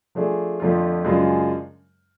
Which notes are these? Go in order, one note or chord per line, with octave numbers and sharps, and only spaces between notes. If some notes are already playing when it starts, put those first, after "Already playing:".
F3 A3 D4 G#4
F2 D3 F3 A3 F4
F#2 C#3 G#3 D4 F4